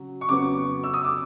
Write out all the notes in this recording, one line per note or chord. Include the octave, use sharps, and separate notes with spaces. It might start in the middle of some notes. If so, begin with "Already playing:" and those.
Already playing: C#3 F#3
C#6
F2 C#3 F#3 B3 D6
E6
D#6
D6